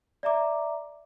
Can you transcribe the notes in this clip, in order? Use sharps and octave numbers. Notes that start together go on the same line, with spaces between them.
D5 E5 A#5 D6